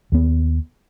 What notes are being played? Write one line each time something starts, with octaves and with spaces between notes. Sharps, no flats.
D#2 B3